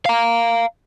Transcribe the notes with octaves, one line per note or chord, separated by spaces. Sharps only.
F5 A#5